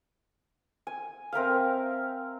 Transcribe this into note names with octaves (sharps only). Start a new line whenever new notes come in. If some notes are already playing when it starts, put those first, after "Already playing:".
G#5
C4 A#4 E5 F5